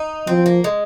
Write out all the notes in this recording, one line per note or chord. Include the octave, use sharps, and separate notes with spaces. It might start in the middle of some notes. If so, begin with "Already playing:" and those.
Already playing: D#4
F3 C4
A#3
G#3